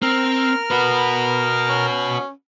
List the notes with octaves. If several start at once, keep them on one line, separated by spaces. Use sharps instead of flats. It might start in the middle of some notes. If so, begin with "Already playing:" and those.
C4 A#4 F6
B3 F#4 B4
C#4